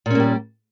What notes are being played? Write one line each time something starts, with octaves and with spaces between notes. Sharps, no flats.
A#2 G3 A#3 C#4